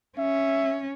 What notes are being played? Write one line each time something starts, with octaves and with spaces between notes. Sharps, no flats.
C#4 E5